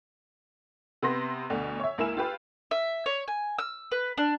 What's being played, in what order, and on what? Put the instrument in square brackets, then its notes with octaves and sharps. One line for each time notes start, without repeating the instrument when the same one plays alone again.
[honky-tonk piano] C3 B3 C6 A#6
D2 B2 D3
C#5 E5
C#2 A#3 E4 G#5 E6 E7
F4 G4 B4
[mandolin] E5
C#5
G#5
E6
B4
D4